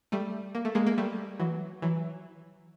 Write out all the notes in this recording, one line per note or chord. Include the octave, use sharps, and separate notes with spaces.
G3 A3
A#3
A3
G#3 A#3
A#3
G3 A3
E3 F#3
E3 F#3